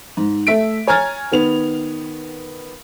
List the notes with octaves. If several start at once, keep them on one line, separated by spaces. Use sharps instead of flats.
G#2
A3 E5 B6 D7
C#5 G#5 A#5 F6 G#6 A6
D#3 B3 F7